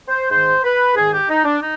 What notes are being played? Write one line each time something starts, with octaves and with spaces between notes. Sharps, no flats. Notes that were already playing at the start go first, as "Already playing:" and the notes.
C5
G#2 D#3 C5
B4
G#2 D#3 G#4
G4
D#4
D4
D#4